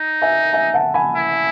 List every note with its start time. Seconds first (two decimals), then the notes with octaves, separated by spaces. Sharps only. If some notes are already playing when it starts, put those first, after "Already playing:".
Already playing: D#4
0.22 E5 G#5
0.53 E5 G#5
0.74 F#5 A5
0.94 G#5 B5
1.16 E4